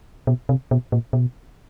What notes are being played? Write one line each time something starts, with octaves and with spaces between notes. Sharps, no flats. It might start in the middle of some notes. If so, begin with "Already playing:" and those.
B2
C3
B2
A#2
B2